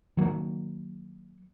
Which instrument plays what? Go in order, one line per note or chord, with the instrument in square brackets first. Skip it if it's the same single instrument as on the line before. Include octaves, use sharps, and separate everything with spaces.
[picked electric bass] D#3 F#3 A3 A#3